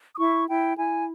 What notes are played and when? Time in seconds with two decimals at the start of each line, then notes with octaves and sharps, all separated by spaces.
0.15 D#6
0.19 E4 C#6
0.49 E4 G5
0.78 E4 G#5